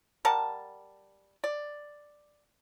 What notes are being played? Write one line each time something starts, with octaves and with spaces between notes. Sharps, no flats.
G3 A#4 F#5 A5
D5